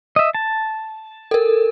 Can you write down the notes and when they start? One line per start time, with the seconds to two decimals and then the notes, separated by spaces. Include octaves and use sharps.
0.16 D#5 E5
0.35 A5
1.31 A4 A#4